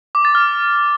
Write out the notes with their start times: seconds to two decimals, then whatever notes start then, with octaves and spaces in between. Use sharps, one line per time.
0.15 D6
0.25 A6
0.35 F6